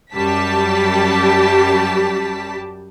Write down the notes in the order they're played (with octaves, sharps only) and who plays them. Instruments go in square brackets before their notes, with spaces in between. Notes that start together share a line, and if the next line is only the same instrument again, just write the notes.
[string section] F#2 G3 G4 A5 B6